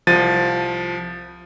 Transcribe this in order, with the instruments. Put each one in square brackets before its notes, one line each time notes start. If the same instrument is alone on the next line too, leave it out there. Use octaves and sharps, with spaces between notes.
[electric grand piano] C2 F3 A6 D#7